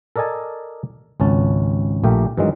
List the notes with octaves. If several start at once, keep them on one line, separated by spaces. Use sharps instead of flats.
A4 A#4 D5 D#5 G#5 A5
G#1 C#2 C#4 A5
A#1 A3 G4 A#4
G2 D#3 E3 F#3 G#3